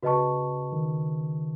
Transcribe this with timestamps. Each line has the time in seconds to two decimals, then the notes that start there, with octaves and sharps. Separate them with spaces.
0.03 C#3 F#4 B4 D#5 A5 C#6
0.73 D#3